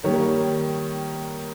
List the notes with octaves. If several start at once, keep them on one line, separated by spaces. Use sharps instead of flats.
D#3 G3 A#3 C#5